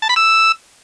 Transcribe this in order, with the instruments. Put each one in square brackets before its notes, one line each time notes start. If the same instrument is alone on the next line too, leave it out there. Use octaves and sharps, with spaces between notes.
[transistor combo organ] A5
B5
E6